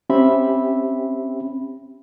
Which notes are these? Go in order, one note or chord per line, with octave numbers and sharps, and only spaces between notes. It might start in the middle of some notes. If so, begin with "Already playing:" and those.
C4 C#4 G4 E5 B5